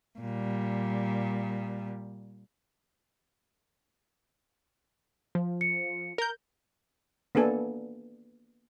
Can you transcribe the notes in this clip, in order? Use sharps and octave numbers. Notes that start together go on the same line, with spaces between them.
A#2 G3
F3
C#7
A#4 G6
A#3 B3 D4 A4 G#5